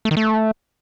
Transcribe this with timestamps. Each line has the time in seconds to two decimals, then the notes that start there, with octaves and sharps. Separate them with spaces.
0.05 A3
0.11 D#3
0.17 A3